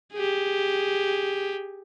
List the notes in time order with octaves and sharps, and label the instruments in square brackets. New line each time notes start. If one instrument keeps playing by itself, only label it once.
[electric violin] G4 G#4